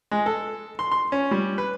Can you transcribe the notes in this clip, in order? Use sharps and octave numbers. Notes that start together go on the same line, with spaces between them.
G#3
A4
C6
C6
C#4
G3
B4